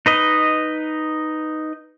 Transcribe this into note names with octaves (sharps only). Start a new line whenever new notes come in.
D#4 B4 D#5